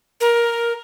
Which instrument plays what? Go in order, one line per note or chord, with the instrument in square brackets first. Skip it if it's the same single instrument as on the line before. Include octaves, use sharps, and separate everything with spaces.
[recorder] A#4